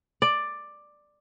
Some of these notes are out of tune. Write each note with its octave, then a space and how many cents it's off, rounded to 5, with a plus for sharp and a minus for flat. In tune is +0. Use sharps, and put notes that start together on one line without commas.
D5 +10